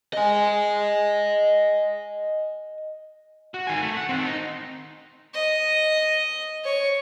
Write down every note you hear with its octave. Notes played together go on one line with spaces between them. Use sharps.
D#5 G#5
F#4
D#3 G#5
A3
F#5
D#3 C4
D#4
D#5
C#5